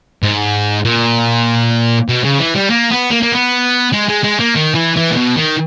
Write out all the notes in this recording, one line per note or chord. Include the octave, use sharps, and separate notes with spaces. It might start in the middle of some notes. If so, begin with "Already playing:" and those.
G#2
A#2
B2
C#3
E3
G3
A#3
B3
A#3
A#3
B3
G#3
G#3
G#3
A#3
D#3
E3
E3
A#2
B2
D#3